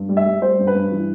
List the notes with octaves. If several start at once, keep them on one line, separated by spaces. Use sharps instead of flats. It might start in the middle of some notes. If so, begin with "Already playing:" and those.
Already playing: G2
G3
E5
G3
G3 C5
G2
B4
G2
E3